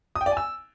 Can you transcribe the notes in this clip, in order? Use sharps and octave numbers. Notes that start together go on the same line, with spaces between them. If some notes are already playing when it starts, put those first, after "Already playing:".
D#6
G5
D5
G#5
E6